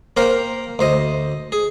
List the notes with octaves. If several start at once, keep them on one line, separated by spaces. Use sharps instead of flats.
A#3 A#4 C5 F5 G5
D2 C5 D#5
G#4